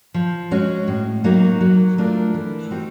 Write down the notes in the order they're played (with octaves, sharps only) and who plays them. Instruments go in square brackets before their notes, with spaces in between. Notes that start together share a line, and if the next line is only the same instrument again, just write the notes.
[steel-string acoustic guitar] F3
G#3 C#4 F#4
A2
F#3 A#3 D#4 F#4
F#3
A3 D4 F4 A#4
E3
G3 C4 D#4 F#4